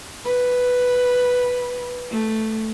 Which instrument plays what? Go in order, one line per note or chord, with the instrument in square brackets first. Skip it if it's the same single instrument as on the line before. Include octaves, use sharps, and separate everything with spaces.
[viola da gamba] B4
A3